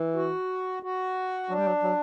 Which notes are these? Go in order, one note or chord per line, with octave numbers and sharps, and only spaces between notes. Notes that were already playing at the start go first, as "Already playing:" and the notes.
Already playing: E3
F#4
F#4
F#3 D4
G3
F#3
F#3